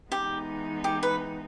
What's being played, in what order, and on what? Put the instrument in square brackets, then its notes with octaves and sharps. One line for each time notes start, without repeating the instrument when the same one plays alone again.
[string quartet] E3 G#3 B3 D#4 [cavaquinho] G4
[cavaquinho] G4
B4